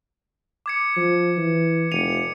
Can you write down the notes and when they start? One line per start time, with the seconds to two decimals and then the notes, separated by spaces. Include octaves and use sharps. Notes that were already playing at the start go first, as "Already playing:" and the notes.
0.66 D6 G#6 C#7
0.96 F3
1.37 E3
1.92 F1 C#7 D#7 F7